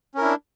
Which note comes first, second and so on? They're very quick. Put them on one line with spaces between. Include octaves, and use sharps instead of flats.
C#4 A#4 E4 D4